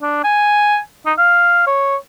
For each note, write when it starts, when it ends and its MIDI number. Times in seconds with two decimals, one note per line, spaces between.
0.02 0.20 62
0.24 0.79 80
1.06 1.13 63
1.18 1.65 77
1.67 1.96 73